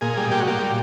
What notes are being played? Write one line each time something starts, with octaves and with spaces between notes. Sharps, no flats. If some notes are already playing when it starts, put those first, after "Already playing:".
A#2 G#4
G3
A#2 G4
F#4
A#2 G4
G3